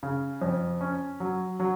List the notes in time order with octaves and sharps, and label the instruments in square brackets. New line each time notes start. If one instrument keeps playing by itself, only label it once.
[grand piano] C#3
F2
C#4
F#3
F#3